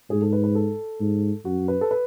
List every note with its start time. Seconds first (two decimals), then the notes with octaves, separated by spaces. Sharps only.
0.10 G#2 G#4
0.22 A4
0.33 B4
0.44 B4
0.55 A4
1.00 G#2
1.45 F#2 F#4
1.68 B4
1.81 A4
1.91 B4